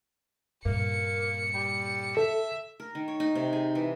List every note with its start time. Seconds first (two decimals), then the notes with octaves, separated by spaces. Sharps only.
0.65 G2 A#2 A#3 C#7
1.54 G3
2.17 A4 E5
2.80 A#4
2.95 D#3
3.08 C#5
3.20 D#4
3.35 C3
3.53 G#4
3.75 E3